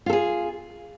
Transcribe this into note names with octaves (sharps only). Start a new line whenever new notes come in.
F4 G#4 A4